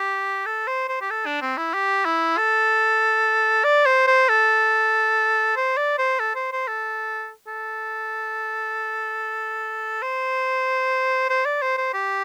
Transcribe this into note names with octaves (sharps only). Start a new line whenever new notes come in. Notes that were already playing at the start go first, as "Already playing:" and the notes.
Already playing: G4
A4
C5
C5
G4
A4
D4
C4
E4
G4
E4
A4
D5
C5
C5
A4
C5
D5
C5
A4
C5
C5
A4
A4
C5
C5
D5
C5
C5
G4